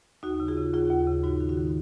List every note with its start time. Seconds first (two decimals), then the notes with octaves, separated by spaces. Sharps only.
0.23 D#2 D#4 F#4
0.40 C#3
0.48 F4 G#4
0.57 C#3
0.74 D#2 F4 G#4
0.90 D#2
1.07 C#3
1.23 G#2 D#4 F#4
1.40 D#3
1.49 D#4 F#4
1.57 D#3